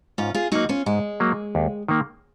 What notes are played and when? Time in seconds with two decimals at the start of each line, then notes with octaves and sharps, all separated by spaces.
0.18 G#2 C#4 F4
0.34 F4 G#4
0.52 F#3 A#3 D#4 F#4
0.69 C#4 F4
0.86 G#2 G#3
1.20 F#3 A#3
1.55 D#2
1.88 D#3 A#3